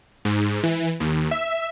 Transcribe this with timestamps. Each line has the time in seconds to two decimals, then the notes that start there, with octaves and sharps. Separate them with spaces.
0.25 G#2
0.63 E3
1.00 D#2
1.31 E5